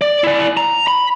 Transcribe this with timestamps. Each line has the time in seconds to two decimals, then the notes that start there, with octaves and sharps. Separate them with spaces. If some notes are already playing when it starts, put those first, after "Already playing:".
0.01 D5
0.24 E4 D5
0.57 A#5
0.87 B5